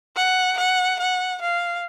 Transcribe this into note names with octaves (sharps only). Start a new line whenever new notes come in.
F#5
F#5
F#5
F5